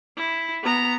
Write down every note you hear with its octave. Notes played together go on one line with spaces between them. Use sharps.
E4
B3 A#5